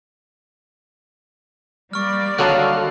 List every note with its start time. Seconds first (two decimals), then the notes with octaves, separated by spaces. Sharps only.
1.93 G3 A#3 D5 C#6 F6
2.38 D3 D#3 F#3 F#4 A4 F5 F#6